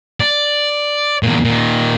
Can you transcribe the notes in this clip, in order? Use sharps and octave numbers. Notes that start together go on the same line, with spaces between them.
D5
E2 A#2
A#2 D#3